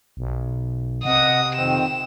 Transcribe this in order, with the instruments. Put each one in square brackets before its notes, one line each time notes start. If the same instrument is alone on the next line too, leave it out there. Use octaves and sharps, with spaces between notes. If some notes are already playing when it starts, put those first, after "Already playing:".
[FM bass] B1
[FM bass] C3 [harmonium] D#5 F#5 [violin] D#6
[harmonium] F2 D#3 C4 [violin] E7